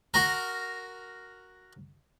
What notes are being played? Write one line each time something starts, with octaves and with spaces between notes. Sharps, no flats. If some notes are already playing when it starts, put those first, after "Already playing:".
F#4 A#4